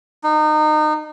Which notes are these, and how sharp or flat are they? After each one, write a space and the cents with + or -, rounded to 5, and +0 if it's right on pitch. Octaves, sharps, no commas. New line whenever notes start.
D#4 -30